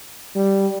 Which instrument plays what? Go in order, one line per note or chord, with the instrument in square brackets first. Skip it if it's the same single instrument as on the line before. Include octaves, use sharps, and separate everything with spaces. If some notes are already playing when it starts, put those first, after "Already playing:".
[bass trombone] G3